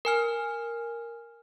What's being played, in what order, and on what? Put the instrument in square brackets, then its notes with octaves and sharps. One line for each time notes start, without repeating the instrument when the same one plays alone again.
[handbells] A#4 G#5 F6